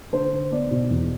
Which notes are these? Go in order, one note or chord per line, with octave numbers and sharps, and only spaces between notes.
D3 C5
D3
B3 D5
B2
E2